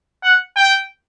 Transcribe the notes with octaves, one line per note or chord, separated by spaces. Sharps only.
F#5
G5